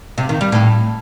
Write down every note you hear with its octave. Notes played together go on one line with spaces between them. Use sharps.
C3
D#3
G3
A2